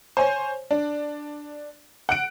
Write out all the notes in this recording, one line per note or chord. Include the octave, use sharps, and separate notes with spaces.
C5 C#5 G#5
D4
F#5 F#6 D7